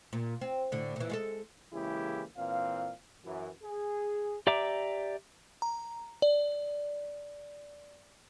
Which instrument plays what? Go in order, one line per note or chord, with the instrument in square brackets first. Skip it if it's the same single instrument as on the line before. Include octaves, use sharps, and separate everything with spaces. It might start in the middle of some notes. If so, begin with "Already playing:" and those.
[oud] A#2
C4
A2 D3
A#2 E3
G#3 F4 A4
[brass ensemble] C#3 E3 G#3 A#3 E4 G4
A#2 E3 C4 F5
F#2 E3
G#4
[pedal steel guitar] G4 D5 E5 A#5 D6
[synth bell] A#5
D5